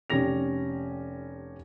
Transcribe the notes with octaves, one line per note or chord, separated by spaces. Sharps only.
F1 C#4 G4 A#6 F7